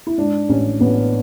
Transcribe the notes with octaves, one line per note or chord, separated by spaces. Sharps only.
E4
G#2 D4
A1 C#4
A1 B3